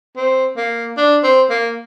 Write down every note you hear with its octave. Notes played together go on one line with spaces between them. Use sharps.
C4
A#3
D4
C4
A#3